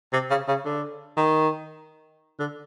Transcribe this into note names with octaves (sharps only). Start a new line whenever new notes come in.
C3
C#3
C#3
D3
D#3
D3